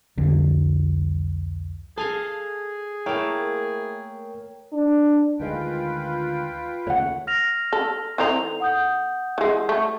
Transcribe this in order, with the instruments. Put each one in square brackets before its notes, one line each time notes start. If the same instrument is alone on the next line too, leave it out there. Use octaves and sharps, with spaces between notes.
[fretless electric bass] C2 F2 D3 G3
[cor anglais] G#4 [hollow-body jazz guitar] A4 [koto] D#5 F5 G#5
[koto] A3 A#3 [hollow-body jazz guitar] E4 [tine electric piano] A#4 C#5 G5
[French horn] D4
[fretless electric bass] D2 D#3 G#3 [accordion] F4 B4 G5
[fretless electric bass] D#2 C#3 A3 [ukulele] C#5 F#5
[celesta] F6 A#6 F7
[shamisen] A4
[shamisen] E3 C4 D#4 [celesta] A4 F7
[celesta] F#5 D#6 G6
[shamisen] E3 G#3
A3